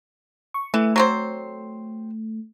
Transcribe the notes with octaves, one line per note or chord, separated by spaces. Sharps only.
C#6
E3 A3
F#3 C4 C5